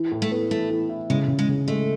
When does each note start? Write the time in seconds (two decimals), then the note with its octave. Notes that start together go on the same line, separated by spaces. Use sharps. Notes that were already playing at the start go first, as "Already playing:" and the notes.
Already playing: E3
0.12 A2
0.22 A3
0.31 B3
0.51 E3 A3
0.70 E3
0.89 E4
1.10 C#3 G#3
1.28 C#3
1.39 G#3
1.48 C#3
1.68 G#3 A3